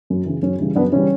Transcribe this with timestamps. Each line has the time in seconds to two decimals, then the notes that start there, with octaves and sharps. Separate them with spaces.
0.10 F#2
0.26 C#3 E3
0.43 F#2 C#4
0.59 C#3 E3 G3
0.75 F#2 B3 D4
0.92 C#3 E3 G3 C#4